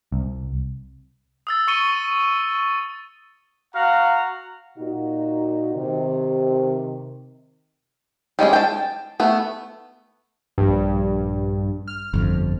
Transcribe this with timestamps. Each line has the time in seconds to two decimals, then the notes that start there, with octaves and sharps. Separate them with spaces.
0.12 C2
1.47 D#6 E6 A6
1.67 C#6 A6 C#7 D#7 G7
3.75 F#4 F5 F#5 A#5
4.78 A#2 D#4 F#4
5.75 C3 D#3
8.39 G3 G#3 C#4 G#4
8.53 G5 A5
9.20 A3 B3
10.58 A#1 G2
11.88 F6
12.14 G1 F2